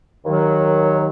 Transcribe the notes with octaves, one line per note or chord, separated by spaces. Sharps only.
D#2 D#3 F#3